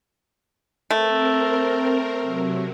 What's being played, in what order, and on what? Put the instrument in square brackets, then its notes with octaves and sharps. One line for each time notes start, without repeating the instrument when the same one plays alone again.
[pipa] A3 [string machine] C4 A#4
[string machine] C3 F#3